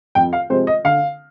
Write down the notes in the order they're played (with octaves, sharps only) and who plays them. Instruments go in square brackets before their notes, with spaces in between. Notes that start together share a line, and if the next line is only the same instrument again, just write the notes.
[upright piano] F2 G5
F5
C3 F3 G#3 C4 C5
D#5
D3 F5